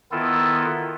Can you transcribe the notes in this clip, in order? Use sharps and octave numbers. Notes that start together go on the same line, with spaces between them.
D#3 B3 E4 F4 A4